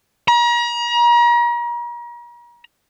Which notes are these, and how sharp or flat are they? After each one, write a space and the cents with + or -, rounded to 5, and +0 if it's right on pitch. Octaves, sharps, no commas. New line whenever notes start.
A#5 +40